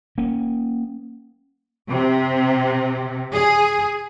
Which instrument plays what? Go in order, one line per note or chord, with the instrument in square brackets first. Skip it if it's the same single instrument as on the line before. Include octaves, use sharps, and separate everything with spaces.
[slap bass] A#3 C#4
[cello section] C3
G#4